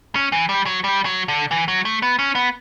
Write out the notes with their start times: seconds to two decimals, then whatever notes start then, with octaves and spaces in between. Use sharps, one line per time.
0.15 C#4
0.32 E3
0.49 G3
0.66 F#3
0.84 G3
1.05 F#3
1.28 D3
1.51 E3
1.68 F#3
1.85 A3
2.02 B3
2.19 C#4
2.35 B3